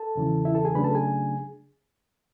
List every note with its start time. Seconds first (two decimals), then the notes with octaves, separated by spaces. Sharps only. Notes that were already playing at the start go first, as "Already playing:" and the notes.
Already playing: A4 A5
0.15 E2 C#3 E3
0.45 E4 E5
0.55 A4 A5
0.65 G#4 G#5
0.75 C#3 F#3 A3 D4 B4 B5
0.84 A4 A5
0.95 G#4 G#5